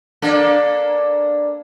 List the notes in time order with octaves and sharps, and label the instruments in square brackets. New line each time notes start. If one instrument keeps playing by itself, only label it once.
[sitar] A#3 D4 A4